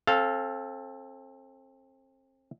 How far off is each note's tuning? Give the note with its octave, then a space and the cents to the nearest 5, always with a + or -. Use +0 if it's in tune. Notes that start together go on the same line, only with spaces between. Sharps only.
C4 +30 A4 -5 F5 +0